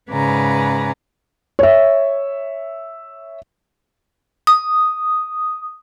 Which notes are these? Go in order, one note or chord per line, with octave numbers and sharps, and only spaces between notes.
G#2 C#3 B4 D5 G#5 A#5
C#5 E5
D#6